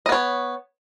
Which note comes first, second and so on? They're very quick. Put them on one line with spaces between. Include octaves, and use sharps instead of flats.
D#5 B3 C#5